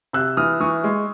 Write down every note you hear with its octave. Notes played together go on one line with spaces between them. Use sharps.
C3 E6 F#6
E3 D#6 F6
E3 C#6 D#6
G#3